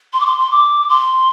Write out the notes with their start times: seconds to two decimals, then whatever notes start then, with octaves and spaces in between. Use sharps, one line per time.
0.13 C6
0.20 D6
0.25 C6
0.38 C6
0.51 D6
0.89 C6